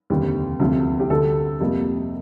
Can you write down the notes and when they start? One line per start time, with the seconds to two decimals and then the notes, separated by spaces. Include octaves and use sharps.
0.10 F1 D#2 D3 G3
0.60 D2 C3 F3 A3
1.00 G4
1.10 D2 D3 G3 A4
1.60 F2 C3 G3 A#3